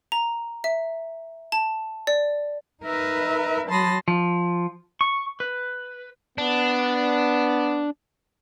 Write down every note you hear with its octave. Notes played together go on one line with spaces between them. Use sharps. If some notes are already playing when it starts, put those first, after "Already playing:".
A#5
E5
A5
D5
D#4 A#4 B4 E5
F#3 A5 B5 C6 D#6 A#6
F3
C#6
B4
B3 D4